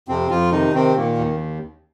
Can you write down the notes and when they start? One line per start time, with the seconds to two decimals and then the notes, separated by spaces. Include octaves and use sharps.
0.08 F2 C3 C4
0.30 F2 F3 F4
0.52 C3 D#3 D#4
0.74 C3 D#3 C4
0.96 A#2 D#3 A#3
1.18 D#2